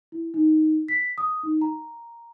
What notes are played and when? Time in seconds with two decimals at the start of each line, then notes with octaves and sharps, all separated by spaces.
0.12 E4
0.34 D#4
0.88 B6
1.18 D#6
1.43 D#4
1.61 A#5